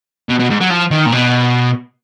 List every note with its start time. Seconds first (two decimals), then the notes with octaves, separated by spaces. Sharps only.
0.29 B2
0.39 B2
0.50 G#2
0.60 F#3
0.70 F3
0.91 D#3
1.06 A#2
1.12 B2